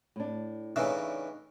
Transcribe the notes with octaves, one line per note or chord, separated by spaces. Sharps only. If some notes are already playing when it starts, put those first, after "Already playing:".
A2 D4
A2 C#3 E3 D4 D#4